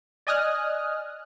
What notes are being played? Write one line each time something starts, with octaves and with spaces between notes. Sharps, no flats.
D5 D#5 G#5 D#6 F6 F#6